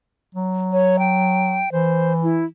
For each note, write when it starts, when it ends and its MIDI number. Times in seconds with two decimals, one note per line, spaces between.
0.35 1.63 54
0.72 0.97 73
0.99 1.69 79
1.72 2.46 52
1.72 2.14 72
2.23 2.45 64